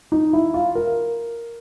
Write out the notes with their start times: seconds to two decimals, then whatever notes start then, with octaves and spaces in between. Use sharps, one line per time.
0.12 D#4
0.33 E4
0.54 F4
0.75 A#4